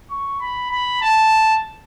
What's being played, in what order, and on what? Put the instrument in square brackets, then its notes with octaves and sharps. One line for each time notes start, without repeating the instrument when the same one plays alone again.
[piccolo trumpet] C#6
B5
B5
A5